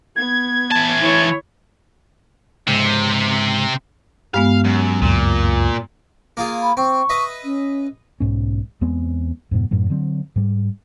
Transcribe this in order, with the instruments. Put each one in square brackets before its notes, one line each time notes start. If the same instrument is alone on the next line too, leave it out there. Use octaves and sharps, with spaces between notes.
[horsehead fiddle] B3 [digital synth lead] G#6
[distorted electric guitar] E3 A5
[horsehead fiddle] E4 C#5
[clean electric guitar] C#2 G#2 [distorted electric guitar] C3
[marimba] G2 G#3 B3 [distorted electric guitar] F5
[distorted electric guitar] F#2
[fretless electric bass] C#2 F#2 F#3 [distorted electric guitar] A#2
[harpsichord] A#3 F4 G#4
[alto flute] B5
[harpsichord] C4 [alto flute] C#6
[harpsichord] B4 D#5 E5
[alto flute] C#4
[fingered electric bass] B1 G#2 C#4
E2 G#3 B3 C4
F2 G#2 B2
F#2 A2 F#3
D3 F#3 C4
G#2 G3